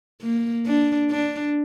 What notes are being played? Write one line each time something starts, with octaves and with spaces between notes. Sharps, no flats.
A#3
D4
D4